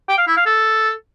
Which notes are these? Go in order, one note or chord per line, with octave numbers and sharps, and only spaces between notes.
G5
F5
E4
F5
A4